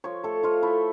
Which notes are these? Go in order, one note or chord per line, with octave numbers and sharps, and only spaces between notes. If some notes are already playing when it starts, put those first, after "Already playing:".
F3 C#5
A3 A4
F3 F4
A3 E4